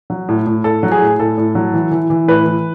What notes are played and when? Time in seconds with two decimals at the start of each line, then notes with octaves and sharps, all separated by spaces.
0.10 F#3
0.29 A2
0.46 A2
0.64 A2 A4
0.83 F#3
0.92 G#4
1.02 A2
1.19 A2 A4
1.37 A2
1.55 F#3
1.73 E3
1.91 E3
2.10 E3
2.28 A2 B4
2.46 E3